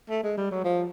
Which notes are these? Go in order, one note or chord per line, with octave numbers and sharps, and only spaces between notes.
A3
G#3
G3
F#3
F3